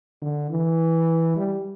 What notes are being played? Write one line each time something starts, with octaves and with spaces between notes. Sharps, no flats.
D3
E3
G3